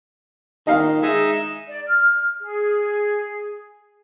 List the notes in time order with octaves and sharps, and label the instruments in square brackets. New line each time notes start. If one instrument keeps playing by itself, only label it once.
[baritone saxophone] D#3 [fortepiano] D#5 F5
[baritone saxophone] G#3 [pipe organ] D#4 E5
[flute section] D5
F6
G#4